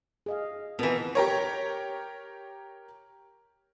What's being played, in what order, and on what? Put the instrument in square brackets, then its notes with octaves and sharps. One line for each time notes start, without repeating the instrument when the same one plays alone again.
[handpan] G#4 D#5 F5
[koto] B2 E3 [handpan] C4 F4 A#4
[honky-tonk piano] G4 A#4 C#5